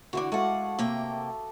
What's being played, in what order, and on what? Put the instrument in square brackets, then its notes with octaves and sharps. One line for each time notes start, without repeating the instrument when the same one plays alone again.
[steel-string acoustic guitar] D3 E3 D4 [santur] F#4 F#5 D6
[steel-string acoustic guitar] G#3 F#5 [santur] A3 A4 F5
[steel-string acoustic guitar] C3 A#3 G5 [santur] D#6 E6